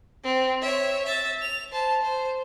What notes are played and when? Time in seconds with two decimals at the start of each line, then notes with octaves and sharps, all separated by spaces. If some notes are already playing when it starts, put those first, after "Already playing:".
0.23 C4
0.62 C#5 E5
1.05 E5 A6
1.41 F7
1.72 C5 A5
2.02 C5